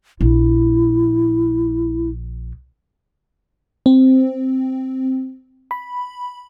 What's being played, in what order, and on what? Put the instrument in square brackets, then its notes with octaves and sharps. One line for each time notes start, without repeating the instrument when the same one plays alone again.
[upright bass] A#1 [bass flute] E4
[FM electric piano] C4
B5